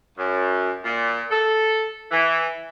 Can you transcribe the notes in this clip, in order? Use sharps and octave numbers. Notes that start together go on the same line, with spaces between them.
F#2
A#2
A4
E3